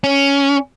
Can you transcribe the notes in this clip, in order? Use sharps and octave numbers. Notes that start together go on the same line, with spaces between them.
C#4